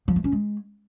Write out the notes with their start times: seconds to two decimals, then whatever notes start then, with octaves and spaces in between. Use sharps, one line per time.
0.08 F3
0.16 A3
0.24 C#4
0.32 G#3